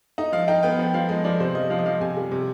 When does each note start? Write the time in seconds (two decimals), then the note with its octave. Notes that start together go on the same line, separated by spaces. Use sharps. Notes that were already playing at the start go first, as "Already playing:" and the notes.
0.18 D#4 D#5
0.32 F3 F5
0.48 D#4 G5
0.63 B3 G5
0.79 F3
0.94 F3 F5
1.09 G#3 D#5
1.24 F3 D5
1.40 C3 C5
1.55 F3 D#5
1.70 F3 F5
1.79 D#5
1.85 F3 F5
2.01 C3 G#5
2.17 G3
2.31 C3